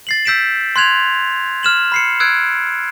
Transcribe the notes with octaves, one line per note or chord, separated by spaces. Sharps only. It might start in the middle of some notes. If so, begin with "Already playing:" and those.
A6 C7 F#7
E6 G6 B6 D7 E7
C6 F#6 G#6 F7
F6 E7 F#7
B5 C7 C#7
E6 F#6 G#6 D7